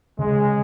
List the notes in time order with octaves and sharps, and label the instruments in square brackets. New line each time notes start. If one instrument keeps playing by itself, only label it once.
[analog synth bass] C#3 [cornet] G#3